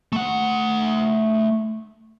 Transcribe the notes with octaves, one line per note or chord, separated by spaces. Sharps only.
A3 F#5